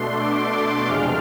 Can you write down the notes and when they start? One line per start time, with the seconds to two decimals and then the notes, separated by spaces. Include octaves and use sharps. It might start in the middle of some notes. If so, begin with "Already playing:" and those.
Already playing: B2 A3 D4 C6
0.20 D6
0.87 E2 C3 F3 G#3 D4 F6